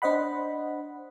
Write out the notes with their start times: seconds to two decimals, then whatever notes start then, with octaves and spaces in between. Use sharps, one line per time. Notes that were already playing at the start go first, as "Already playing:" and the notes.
0.02 D4 C5 D#5 F#5 B5